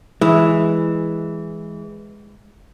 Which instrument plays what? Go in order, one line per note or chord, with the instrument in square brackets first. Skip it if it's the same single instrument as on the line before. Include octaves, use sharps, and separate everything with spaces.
[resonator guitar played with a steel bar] E3 [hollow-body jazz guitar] G#3